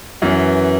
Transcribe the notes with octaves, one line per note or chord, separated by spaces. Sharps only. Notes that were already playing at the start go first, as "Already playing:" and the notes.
F#2 E3 B3